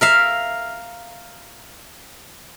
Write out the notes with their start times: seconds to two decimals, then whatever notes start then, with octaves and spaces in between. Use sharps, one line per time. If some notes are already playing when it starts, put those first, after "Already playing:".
0.01 A#4 E5 F5